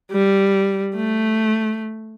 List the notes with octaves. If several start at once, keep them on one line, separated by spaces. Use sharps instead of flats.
G3
A3